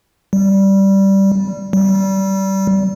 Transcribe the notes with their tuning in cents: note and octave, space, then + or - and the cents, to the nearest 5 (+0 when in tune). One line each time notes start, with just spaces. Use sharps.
G3 -10
G3 -25